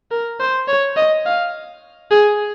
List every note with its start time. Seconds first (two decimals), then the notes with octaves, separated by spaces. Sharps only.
0.11 A#4
0.40 C5
0.68 C#5
0.97 D#5
1.26 F5
2.11 G#4